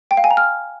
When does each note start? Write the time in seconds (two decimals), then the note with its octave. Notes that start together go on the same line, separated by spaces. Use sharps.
0.11 G5
0.17 F5
0.24 G#5
0.31 A#5
0.37 F6